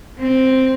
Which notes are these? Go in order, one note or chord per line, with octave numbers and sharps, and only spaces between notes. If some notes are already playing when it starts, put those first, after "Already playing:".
C4